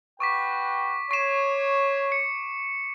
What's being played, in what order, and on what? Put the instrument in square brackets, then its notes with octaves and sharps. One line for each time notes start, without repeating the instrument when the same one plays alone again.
[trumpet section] F#4 B4 G5 [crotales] C#6 D6 B6
[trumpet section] C#5 [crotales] C#6 C7 E7
[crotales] C#7